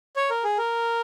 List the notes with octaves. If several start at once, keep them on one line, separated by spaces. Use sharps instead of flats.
C#5
A#4
G#4
A#4